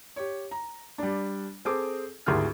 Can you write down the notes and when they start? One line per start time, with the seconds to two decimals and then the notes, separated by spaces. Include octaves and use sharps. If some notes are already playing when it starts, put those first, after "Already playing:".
0.16 G4 C#5
0.51 A#5
0.98 G3 D4
1.65 C4 G#4 A4 D6
2.26 G#1 D2 E4 G4 G#4 F6